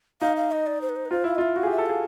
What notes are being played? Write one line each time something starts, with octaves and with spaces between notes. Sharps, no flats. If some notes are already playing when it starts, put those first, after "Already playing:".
D#4 F5
F5
D#5
D5
C5
B4
C5
B4
F4 C5
E4 F5
D#5
F4
E5
F#4 F5
G#4
G4
E5
A4
G#4 F5